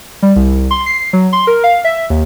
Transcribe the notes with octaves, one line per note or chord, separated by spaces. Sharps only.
G3
C2
C6
C7
F#3
C6
A#4
F5
E5
D#2